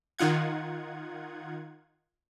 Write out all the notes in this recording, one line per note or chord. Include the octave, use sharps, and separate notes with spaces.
D#3 D#4 F4 F#5 G#6